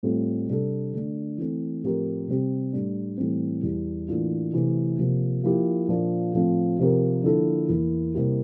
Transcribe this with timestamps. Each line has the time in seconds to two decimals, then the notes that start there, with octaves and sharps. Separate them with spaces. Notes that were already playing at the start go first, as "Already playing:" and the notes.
0.03 A2 G3 C4 F4
0.48 C3 G3 D4 A4
0.93 D3 A3 D4
1.38 E3 A3 C4
1.83 A2 F3 C4 G4 A#4
2.28 C3 G3 C4 G4
2.73 A2 G3 D4
3.18 A2 E3 G3 C4
3.63 E2 E3 G3
4.08 A2 E3 A#3 D4 F4
4.53 C3 E3 A3
4.99 C3 F3 A#3
5.43 F3 A#3 E4 G4
5.88 A#2 F3 A#3 D4
6.34 A2 F3 C4
6.79 C3 F3 C4 G4 A#4
7.23 D3 F3 A#3 E4 A4
7.68 E2 E3 A#3 E4
8.14 C3 G3 A#3 E4 G4